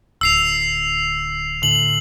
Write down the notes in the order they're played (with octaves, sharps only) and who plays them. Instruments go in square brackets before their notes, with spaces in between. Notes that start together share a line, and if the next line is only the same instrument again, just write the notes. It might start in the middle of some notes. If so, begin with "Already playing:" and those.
[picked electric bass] D1 D2 [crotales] E6 C7 F7
[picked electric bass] A2 D3 [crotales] F#7